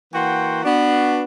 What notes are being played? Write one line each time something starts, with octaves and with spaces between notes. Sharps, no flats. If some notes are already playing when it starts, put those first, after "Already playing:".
E3 A#3 F#4 F#5 G5 C6
B3 D4 F#4